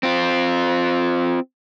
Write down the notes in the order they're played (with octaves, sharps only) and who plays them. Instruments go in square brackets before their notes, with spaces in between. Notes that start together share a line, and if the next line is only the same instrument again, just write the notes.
[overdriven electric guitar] C4 F4